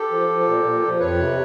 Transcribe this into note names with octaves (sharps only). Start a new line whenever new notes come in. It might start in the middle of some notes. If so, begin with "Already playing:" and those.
Already playing: G4 A4
F3
F3
A#2
A#2
F3
F2 B4 C#5
C3